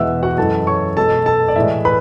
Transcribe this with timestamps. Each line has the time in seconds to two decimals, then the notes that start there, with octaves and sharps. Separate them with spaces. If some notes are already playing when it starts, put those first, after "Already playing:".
Already playing: E2 B2 G#3 E5 F#5 E6
0.23 F#4 F#5
0.38 F#2 E3 G#3 A4 A5
0.67 C#5 C#6
0.97 B2 G#3 A4 A5
1.26 A4 A5
1.48 D5
1.56 A2 E3 G#3 E5
1.85 B4 B5